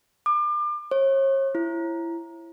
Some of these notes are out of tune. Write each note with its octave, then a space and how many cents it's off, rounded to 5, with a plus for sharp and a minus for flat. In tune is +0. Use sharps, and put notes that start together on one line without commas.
D6 +35
C#5 -40
E4 +25